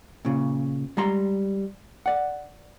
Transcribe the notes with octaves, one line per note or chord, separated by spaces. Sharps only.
A#2 C#3
G3 G#3 A#5 C6
D5 F#5